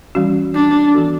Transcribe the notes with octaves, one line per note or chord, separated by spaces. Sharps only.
E3 G3 C#4 F#4
D4
E3 B3 F#4 A4